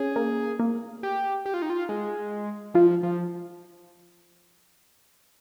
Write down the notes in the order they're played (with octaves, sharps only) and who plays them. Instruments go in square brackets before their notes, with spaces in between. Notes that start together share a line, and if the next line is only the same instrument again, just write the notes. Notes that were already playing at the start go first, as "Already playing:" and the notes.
Already playing: [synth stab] C#4 [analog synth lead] G#4
[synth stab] A#3
A#3
[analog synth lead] G4
G4
F4
D#4
F4
G#3
[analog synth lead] F3 [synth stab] F4
[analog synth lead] F3